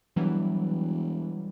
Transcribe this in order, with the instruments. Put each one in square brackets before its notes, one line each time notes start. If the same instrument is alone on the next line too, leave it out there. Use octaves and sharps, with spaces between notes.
[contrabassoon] E1 [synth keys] E3 F#3 G3